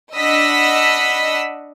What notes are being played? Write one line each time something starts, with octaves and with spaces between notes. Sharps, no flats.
D4 D#5 F#5 B5 E6 B6